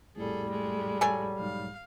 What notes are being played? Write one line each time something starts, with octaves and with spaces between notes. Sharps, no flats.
A#1 F2 A2 G3 G#4 A4
G#3 A3
F#3 A4 G#5
B1 G#2 F5